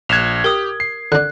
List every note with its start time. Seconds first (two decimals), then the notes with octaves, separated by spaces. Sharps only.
0.09 A#1 F#6 G#6 E7 F7
0.44 G4 A#4 D#6
0.80 C7
1.12 D3 D4 F#6